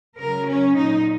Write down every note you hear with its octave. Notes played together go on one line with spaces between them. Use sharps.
C#3 F#3 A#4
C#4
A#2 F#3 D#4